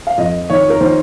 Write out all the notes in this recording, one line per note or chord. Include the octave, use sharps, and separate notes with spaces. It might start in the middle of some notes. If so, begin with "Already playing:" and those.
F5
F2 D#5
D#3 C#5
A#4
D#3 C5